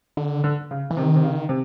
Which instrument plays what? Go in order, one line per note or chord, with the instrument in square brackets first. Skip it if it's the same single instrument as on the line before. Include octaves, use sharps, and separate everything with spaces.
[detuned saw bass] D3
[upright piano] D3
C#3
[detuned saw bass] E3
[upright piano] C3 [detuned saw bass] D#3
[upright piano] C3
C#3
C3